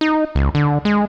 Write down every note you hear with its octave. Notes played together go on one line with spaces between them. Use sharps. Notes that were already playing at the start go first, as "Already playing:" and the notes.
D#4
C#2
D3
G#3